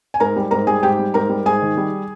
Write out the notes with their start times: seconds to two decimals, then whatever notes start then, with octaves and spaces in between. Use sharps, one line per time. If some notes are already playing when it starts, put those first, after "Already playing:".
0.14 G#5
0.20 G#2 A#4 A#5
0.36 G3
0.51 G#2 A#4 A#5
0.67 G3 G#4 G#5
0.83 G#2 G4 G5
0.99 G3
1.14 G#2 A#4 A#5
1.29 G3
1.46 G#2 G#4 G#5
1.62 D#3
1.77 G3